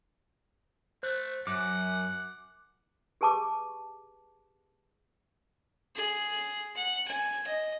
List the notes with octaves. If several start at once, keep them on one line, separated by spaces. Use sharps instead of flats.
A3 C5 F#6
F#2 F#5 D6 F#6
G4 G#4 B4 A5 C#6 D6
G#4
F#5
G#5
D#5